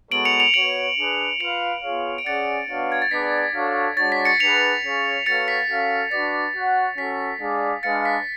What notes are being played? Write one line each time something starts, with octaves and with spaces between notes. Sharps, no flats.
G#3 B3 F#4 A4 C#5 D7 F#7
C#7 F7
C#7 F7
B3 F#4 C#5 D7 F#7
D4 G#4 B4
F4 B4 F5 C#7 F7
B3 F4 G#4 C#5 F5
D7
C#4 G#4 D5 F#5 A6 C#7
B3 D4 F#4 C#5 F5
G#6
A6
B3 D4 G#4 B4 D5 B6
D4 F#4 A4 C#5 F5
G#3 D4 F#4 C#5 A6
B6
A6 C#7
D4 G#4 B4 F#5 C#7 F7
C#4 G#4 C#5 F5
B3 F#4 A4 C#5 F5 A6 C#7
B6
C#4 F#4 A4 F5
D4 F#4 B4 D5 A6
F#4 C#5 F#5
C#4 F#4 A4 B6
G#3 D4 G#4 D5 F5
G#3 D4 G#4 B4 F5 A6 C#7
B6